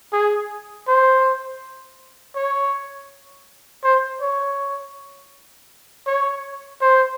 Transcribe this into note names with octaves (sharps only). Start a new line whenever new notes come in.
G#4
C5
C#5
C5
C#5
C#5
C5